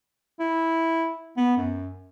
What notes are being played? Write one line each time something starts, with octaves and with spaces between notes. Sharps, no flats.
E4
B3
F#2